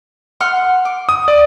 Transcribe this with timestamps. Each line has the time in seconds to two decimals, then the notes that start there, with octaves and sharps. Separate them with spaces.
0.40 F#5 C6 F6
0.85 D6
1.09 D#6
1.28 D5